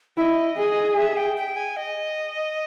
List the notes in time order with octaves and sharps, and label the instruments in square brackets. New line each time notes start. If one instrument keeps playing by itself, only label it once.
[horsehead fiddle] E4 [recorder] E5
[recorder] D#5
[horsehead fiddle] G#4
[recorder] E5
G5
G5
G#5
D#5